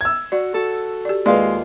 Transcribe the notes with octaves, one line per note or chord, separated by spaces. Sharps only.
E6 G#6
F#4 D5
F#4 A4
G4 D5
D#2 G#3 F4 B4 D5 F5